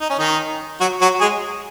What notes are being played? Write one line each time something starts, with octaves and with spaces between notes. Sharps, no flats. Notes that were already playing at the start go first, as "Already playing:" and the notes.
D#4
C#4
D#3 D#4
F#3 F#4
F#3 F#4
G#3 G#4